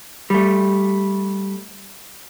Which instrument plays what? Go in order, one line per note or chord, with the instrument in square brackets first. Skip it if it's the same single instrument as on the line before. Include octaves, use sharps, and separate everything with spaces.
[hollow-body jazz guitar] G3 A3